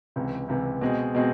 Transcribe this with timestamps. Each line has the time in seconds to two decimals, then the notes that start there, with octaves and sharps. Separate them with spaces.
0.16 C#2 C3 E3
0.48 C#2 C3 E3
0.81 B2 G#3 C4
1.15 B2 G#3 C4